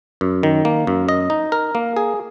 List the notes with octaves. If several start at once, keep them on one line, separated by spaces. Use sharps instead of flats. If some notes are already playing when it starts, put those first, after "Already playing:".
F#2
D#3
A#3
F#2
D#5
D#4
A#4
A#3
G#4